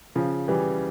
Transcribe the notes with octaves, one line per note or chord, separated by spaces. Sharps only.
C#3 F3
E3 G3